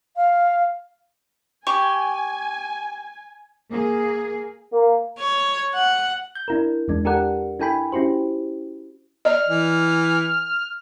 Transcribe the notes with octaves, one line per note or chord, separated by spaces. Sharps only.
F5
G4 G#5 C#6
A#3 G#4
A#3
C#5
F#5
G6
D4 E4 A#4
E2 G#3 D4
D4 G4 A4 A#4 D5 F#5
D4 E4 A4 G5 G#5 B5
C#4 E4 F#4 G4 C5
D5 D#5 F6
E3